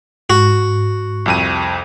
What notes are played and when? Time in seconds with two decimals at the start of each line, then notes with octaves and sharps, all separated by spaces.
0.30 G#2 F#4
1.26 C2 F2 D#7